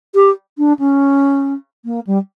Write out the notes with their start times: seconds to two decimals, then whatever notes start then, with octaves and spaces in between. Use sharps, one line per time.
0.15 G4
0.58 D4
0.79 C#4
1.85 A#3
2.07 G3